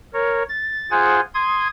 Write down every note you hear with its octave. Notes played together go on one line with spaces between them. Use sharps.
A#4 C#5
A6
F4 G#4 C5 F#5 G#5
C6 D#6 G#6